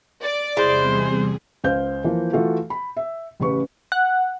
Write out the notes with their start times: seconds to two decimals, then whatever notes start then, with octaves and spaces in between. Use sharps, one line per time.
0.23 D5
0.57 E2 C3 G3 G#3 E4 C5
0.91 G#4
1.64 C#2 C5 F5 G6
2.04 E3 F3 A#3
2.33 E3 A3 F4 F#4 A4
2.70 B5
2.97 E5
3.40 A1 C#3 G4 B4 C#6
3.92 F#5